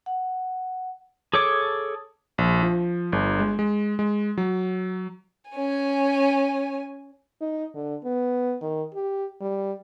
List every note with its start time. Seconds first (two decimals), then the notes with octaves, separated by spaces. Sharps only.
0.06 F#5
1.33 G#4 A4 C#5 D6
2.38 A#1
2.63 F3
3.12 G1
3.39 G#3
3.59 G#3
3.99 G#3
4.37 F#3
5.50 C#4 G#5
7.41 D#4
7.75 D3
8.04 B3
8.62 D#3
8.94 G4
9.41 G3